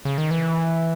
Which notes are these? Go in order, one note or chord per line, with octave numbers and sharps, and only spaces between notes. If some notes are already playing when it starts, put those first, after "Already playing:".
C#3
D#3
E3